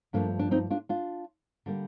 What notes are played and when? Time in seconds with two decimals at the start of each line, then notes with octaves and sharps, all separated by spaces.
0.13 G2 F3 A3 A#3 D4
0.39 D4
0.51 C4 D#4
0.70 D4 F4
0.89 D4 F4
1.66 D3 G3 A#3